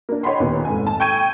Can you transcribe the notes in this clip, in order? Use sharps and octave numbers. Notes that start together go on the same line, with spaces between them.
A#3 D4
C#5 D#5 F#5 G5 B5 C6
D#2 A#2 B3
F1 G#2 G#5
G#5 A5
G5 C#6 G6 G#6 D#7